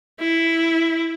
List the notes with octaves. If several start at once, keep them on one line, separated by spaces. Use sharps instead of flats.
E4